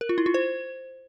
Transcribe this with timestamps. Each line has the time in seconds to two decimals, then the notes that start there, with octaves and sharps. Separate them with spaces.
0.01 A#4
0.09 F4
0.18 E4
0.26 F4
0.34 C5